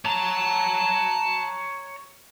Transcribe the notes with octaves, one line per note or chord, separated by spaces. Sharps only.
C#5 A5 A#5